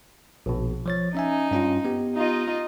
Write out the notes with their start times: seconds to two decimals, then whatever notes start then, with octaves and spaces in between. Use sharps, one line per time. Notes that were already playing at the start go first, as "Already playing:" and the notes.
0.46 A#1 B2
0.86 F3 C#5 A6
1.15 C#4 D#4 E5 G#5
1.51 G2 C#4 F4
1.85 B3 G4
2.15 D#4 F4 D#5